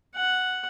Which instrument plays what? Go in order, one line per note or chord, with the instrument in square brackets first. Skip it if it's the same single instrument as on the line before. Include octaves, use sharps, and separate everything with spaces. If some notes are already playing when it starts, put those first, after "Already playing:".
[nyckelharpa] F#5